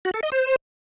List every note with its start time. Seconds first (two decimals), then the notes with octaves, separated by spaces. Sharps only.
0.05 F#4
0.14 A4
0.23 D#5
0.32 C5